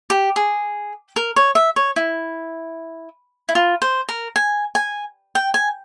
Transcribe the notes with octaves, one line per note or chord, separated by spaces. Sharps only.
G4
G#4
A#4
C#5
E5
C#5
E4
E4
F4
C5
A#4
G#5
G#5
G5
G#5